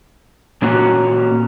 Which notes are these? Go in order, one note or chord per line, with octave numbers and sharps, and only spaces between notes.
A#2 A#3 C#4 F#4